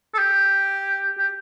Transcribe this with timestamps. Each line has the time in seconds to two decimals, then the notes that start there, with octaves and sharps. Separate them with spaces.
0.14 A4
0.18 G4
1.18 G4